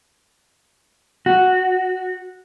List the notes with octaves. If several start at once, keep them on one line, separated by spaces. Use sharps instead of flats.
F#4